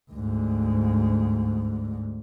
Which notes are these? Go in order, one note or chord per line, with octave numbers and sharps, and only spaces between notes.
D2 G#2